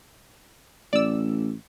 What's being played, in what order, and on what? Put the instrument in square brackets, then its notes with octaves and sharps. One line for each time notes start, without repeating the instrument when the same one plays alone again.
[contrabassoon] A1 [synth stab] D5 E6